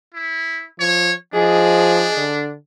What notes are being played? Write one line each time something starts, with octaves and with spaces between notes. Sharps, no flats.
E4
F3 C#5
F3 D4 G#4 D#5
D3